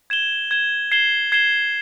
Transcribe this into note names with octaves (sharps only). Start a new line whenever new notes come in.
G#6 E7 G7
G#6 E7 G7
G#6 C7 E7 G7
G#6 C7 E7 G7